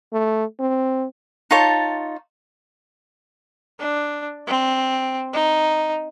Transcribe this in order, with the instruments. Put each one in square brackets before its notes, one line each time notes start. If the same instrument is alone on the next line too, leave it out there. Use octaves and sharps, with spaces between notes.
[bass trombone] A3
C4
[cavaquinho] D#4 F4 C#5 A5
[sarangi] D4
C4
D#4